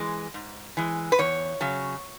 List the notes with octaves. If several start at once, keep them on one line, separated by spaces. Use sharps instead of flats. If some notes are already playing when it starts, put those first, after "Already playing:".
Already playing: E3 G#3
G#2
E3 G#3
B4
E2 C#5
C#3 F#3